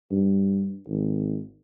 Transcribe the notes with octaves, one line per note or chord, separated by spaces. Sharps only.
G2
G#1